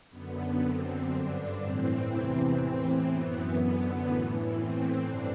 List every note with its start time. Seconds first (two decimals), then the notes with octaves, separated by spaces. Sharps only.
0.10 F#2 D3 B3
0.60 F#2 D3 C4
1.09 G2 D3 D4
1.58 A2 E3 C4
2.08 E2 C3 E3
2.57 A2 E3 C4
3.06 F#2 E3 B3
3.55 F#2 D3
4.05 A2 E3
4.54 A2 E3 C4
5.03 G2 D3 D4